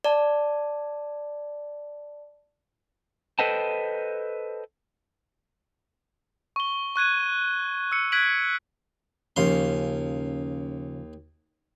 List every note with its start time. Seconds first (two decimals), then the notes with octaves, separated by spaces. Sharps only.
0.04 D5 A5
3.39 A4 B4 C5 D#5 G5 A5
6.56 C#6 G7
6.96 C#6 F#6 G#6 D#7
7.92 E6 C#7
8.12 F#6 G#6 B6 D7 F#7
9.36 D#2 C#3 F3 C#4 F5 C6